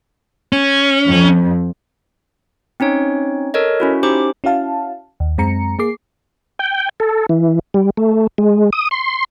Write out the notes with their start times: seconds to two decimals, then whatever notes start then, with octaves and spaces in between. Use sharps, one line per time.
0.53 C#4
1.06 F2
2.80 C4 C#4 D#4 C#5
3.54 A4 A#4 C#5 D#5
3.80 C#4 E4 F#4
4.03 C#4 D#4 G4 C5 D6
4.44 C#4 E4 F#4 F5 A5
5.20 D#2
5.38 F#2 G#3 C4 A#5 C#7
5.79 A#3 G#4 D6 C7
6.59 G5
7.00 A4
7.29 E3
7.74 G3
7.97 A3
8.38 G#3
8.73 D#6
8.91 C6